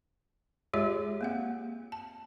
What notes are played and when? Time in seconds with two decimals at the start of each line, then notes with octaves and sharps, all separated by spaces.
0.74 G#3 F4 G4 G#4 C#5 E5
1.21 A#3 C4 F#5
1.92 A5